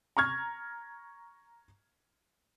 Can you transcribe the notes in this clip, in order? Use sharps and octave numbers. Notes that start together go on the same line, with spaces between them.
A#5 C#6 F6 G#6